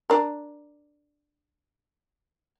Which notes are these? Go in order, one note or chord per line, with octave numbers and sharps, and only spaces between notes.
D4 A#4